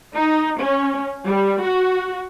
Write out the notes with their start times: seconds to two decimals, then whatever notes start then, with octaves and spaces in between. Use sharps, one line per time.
0.16 D#4
0.61 C#4
1.26 G3
1.63 F#4